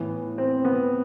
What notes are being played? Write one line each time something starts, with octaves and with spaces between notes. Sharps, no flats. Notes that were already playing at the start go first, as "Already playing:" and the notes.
Already playing: A2 E3 B3
C4
B3